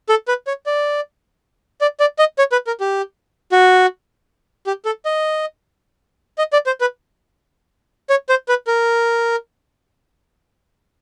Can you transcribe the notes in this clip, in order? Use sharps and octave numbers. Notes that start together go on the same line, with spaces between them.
A4
B4
C#5
D5
D5
D5
D#5
C#5
B4
A#4
G4
F#4
G4
A4
D#5
D#5
D5
C5
B4
C#5
C5
B4
A#4